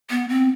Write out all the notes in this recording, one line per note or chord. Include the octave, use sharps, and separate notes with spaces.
B3
C4